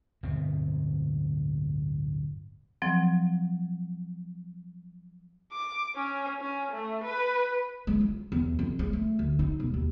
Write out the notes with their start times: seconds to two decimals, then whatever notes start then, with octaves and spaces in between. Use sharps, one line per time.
0.23 D1 G1 B2 C4
2.82 F3 F#3 C4
5.52 D6
5.95 C#4
6.40 C#4
6.72 A3
7.04 B4
7.87 G#3
8.01 F4
8.32 E2
8.59 F2
8.79 G#3
8.93 A3
9.19 D2
9.39 D#4
9.60 E1
9.74 D#2